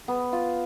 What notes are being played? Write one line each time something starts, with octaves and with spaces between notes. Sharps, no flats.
B3
F4